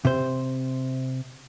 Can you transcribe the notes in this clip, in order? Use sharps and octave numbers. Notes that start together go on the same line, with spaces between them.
C3 C5